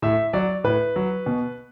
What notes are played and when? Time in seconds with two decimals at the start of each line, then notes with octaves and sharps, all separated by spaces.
0.02 A2 E5
0.33 F#3 D5
0.64 A2 B4
0.96 F#3
1.26 B2